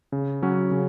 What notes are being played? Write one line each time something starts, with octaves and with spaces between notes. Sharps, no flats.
C#3
F#3 C#4 F#4
C#3